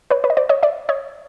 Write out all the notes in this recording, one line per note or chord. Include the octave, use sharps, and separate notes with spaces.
B4 C#5
B4 C#5
D#5
C5 D5
C#5 D#5
D5 E5
C#5 D#5